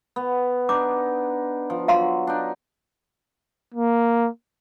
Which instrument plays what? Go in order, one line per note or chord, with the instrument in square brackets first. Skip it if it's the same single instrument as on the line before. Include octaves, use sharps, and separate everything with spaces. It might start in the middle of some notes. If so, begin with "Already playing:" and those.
[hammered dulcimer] B3
[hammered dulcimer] D4 D#4 [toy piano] D6
[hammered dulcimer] F3
[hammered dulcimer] F#3 [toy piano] F5 A#5 C6
[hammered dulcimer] D4 D#4
[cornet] A#3